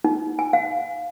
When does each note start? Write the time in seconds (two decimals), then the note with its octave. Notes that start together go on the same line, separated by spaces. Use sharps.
0.04 D#4
0.39 G#5
0.53 F5